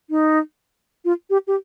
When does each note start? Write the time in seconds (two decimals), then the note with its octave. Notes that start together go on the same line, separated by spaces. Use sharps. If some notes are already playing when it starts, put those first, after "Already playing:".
0.10 D#4
1.05 F4
1.30 G4
1.47 G4